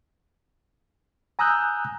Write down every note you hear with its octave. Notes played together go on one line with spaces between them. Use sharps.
G#5 A#5 D#6 E6 F#6 G6